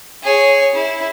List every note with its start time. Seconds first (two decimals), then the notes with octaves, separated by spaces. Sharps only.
0.24 G#4 C#5
0.75 E4